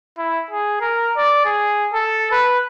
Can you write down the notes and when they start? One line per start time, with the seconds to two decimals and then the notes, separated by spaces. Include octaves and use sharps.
0.18 E4
0.50 G#4
0.81 A#4
1.17 D5
1.45 G#4
1.93 A4
2.31 B4